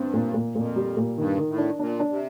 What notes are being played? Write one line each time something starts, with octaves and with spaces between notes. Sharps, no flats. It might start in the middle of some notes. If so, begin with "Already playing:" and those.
Already playing: G2 C4
A#2
A#2
F2 A#2
G3
A#2
G2 D#3
D#3
A2
D4
A#2 D4
D4
C3